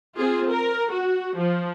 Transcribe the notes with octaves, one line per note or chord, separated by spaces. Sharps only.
C4 F4 G#4
A#4
F#4
F3